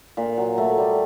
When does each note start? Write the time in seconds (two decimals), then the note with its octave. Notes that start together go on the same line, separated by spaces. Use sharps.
0.17 A#2
0.38 F#3
0.58 A3
0.78 G3